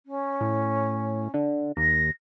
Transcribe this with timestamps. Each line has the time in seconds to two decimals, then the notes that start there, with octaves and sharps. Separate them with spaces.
0.05 C#4
0.41 A2
1.34 D3
1.77 D#2 A#6